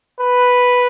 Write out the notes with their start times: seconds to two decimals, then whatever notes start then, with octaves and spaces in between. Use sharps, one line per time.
0.21 B4